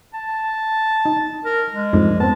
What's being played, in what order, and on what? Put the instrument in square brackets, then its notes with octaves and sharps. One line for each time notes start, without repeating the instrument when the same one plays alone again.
[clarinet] A5
[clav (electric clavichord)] D#4
[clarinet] A#4
G#3
[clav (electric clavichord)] F2 G#2 D4
[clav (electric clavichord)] B3 C4 [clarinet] A5